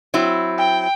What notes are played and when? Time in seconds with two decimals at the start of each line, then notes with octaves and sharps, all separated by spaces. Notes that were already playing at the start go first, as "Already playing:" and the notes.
0.14 F#3 C4 E4
0.58 G5